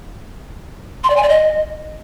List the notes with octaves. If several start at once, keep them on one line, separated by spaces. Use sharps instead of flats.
C6
D5
G#5
D5
D#5